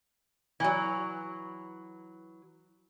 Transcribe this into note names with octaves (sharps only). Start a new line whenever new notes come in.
E3 F#3